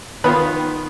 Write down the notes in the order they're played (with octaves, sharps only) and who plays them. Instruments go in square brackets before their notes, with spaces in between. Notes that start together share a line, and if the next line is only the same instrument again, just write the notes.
[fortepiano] D#3 B3 F4 B4